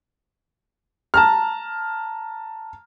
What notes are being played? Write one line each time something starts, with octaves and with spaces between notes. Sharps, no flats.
A5 A#5 F6